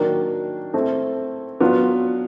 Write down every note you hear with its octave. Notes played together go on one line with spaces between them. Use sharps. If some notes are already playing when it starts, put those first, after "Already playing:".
Already playing: D#3 F#3 A#3 D4
A3 C4 E4 A4
F#3 B3 D4 F4